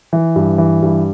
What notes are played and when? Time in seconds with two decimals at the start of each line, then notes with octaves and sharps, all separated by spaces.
0.13 E3
0.36 G2
0.58 E3
0.83 G2